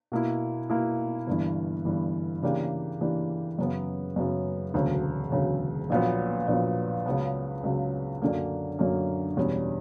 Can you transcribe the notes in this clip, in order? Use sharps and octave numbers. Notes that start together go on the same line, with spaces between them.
B2 A#3 E4
B2 A#3 E4
G1 G2 E3
G1 G2 E3
C#3 E3 A#3 D4 G4
C#3 E3 A#3 D4 G4
F#2 C#3 F#3 B3
F#2 C#3 F#3 B3
E1 D2 C#3 F#3
E1 D2 C#3 F#3
A#1 A#2 F#3 B3
A#1 A#2 F#3 B3
C#2 C#3 F#3 B3
C#2 C#3 F#3 B3
F#2 D3 F#3 A#3
F#2 D3 F#3 A#3
E1 E2 B2 G3 C#4